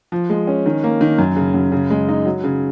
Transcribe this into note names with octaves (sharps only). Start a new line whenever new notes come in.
F3
G#3
C#4
D#3
A#3
D#3
F#2
C#3
F#2
C#3
G#3
D#4
F#3
C#3